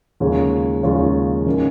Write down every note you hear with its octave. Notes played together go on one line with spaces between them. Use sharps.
D#2 C#3 G#3 F4 C#5
D#2 C#3 G#3 F4 C#5
D#3 A#3 C#4